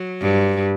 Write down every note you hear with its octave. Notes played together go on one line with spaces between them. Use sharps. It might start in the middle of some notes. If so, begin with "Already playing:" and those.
Already playing: F#3
G2